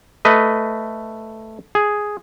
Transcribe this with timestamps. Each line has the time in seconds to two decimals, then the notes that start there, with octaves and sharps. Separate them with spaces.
0.25 A3 B4 D#5
1.75 G#4